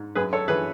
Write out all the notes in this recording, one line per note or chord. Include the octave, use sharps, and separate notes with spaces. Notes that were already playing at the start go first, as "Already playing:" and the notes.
Already playing: G#2
F#2 G#4 B4
A4 C#5
E3 G#4 B4